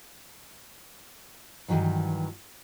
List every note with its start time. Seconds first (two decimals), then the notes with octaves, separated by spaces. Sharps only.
1.68 G2 C3 D#3 E3 F#3